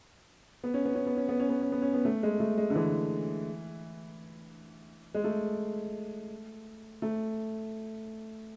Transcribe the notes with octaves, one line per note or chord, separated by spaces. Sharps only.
B3
C#4
B3
C#4
B3
C#4
B3
C#4
B3
C#4
B3
C#4
B3
A3
G#3
A3
G#3
D3
E3
G#3
A3
A3